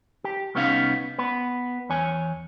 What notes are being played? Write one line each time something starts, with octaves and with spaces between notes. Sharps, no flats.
G4
C2 B3 C#4 D#4 D#5 F5
B3 B4
E2 C#5 G#5